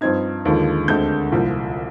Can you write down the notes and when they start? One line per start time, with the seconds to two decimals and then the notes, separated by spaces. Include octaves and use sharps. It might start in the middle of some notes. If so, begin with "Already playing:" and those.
0.01 G2 F3 C4 D#4 G#6
0.45 D#2 D3 F3 G#3
0.88 D2 D3 G#3 C4 G6
1.32 C2 A#2 F3